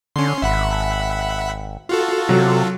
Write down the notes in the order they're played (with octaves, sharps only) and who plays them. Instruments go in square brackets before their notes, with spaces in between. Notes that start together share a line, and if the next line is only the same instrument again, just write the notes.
[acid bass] D3 [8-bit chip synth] C#4 C6
[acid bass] G#1 [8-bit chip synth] E5 F#5 B5
[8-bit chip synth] F4 F#4 A4
[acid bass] C3 [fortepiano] F#3